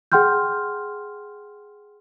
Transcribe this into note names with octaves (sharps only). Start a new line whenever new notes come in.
G#4 F#5 G5 C6 F6 G6